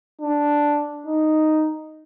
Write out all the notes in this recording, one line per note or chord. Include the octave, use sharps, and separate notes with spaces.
D4
D#4